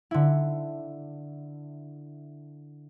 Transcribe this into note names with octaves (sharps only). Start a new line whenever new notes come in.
D3 E4